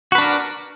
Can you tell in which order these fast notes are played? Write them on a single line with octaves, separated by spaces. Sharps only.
F#4 B4 D4 A#4